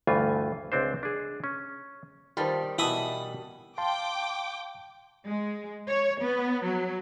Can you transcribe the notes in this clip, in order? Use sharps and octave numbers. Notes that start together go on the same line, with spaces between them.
D2 G2 E3 A3 F4 G#5
C#2 C4 D4 C5
D4 G#4
C#4
D#3 G3 F4 C5 A5
B2 E3 E4 A5 B5 D#6
F5 G5 A5 C6 D6
G#3
C#5
B3
F#3